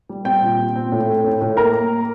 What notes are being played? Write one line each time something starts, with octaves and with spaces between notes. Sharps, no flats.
G3
C4 G5
A#2
A#2
C4
A2
A3
A2
A2
A#3 A#4 A#5
A#3